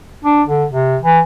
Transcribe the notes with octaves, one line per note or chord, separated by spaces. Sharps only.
D4
D3
C3
E3